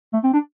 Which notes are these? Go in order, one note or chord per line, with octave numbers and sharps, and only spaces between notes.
A3
C4
D4